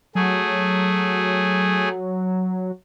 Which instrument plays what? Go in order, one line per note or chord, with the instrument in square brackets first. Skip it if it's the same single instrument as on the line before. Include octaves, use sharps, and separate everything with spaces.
[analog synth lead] F#3 [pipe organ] A3 G#4